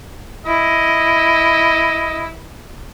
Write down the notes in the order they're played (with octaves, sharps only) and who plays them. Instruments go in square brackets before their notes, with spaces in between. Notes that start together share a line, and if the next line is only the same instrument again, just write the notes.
[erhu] E4 [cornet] D#5